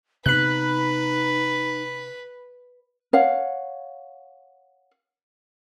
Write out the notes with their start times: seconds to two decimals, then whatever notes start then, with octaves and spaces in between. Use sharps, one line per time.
0.26 C3 B3 D#4 B4 B5 F#6
3.13 C#5 F5 F#5